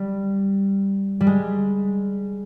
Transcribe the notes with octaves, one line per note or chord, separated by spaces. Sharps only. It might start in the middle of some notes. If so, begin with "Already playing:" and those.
Already playing: G3
G3
G#3